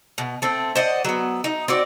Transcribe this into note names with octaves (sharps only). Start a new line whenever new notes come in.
B2
A3 C4
C5 D5 D#5 F#5
F#3 B3
D#4
C4 F#4 D5